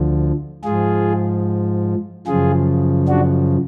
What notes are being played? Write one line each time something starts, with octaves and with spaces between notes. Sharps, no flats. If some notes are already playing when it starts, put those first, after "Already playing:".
Already playing: D2 D3 F3
G#2 F3 F4 G#4
F#2 C#3 F3 F4 G#4
D4 F#4